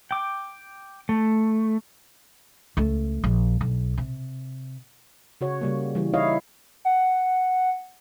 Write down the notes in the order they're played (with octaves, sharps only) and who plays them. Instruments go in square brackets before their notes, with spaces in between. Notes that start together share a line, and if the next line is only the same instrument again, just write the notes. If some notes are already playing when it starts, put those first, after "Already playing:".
[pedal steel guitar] G5 D6
A3
[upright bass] C#2 A3
A#1
B1
C3
[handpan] C#3 F#4 C#5
C#3 G3 A#3
E3 G3
D#4 E4 C#5 D#5 F5
[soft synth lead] F#5